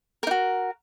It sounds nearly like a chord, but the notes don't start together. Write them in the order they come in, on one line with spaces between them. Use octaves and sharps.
A#4 D#4 F#4